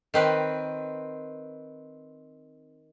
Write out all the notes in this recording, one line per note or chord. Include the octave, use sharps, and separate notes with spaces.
D#3 C4 B4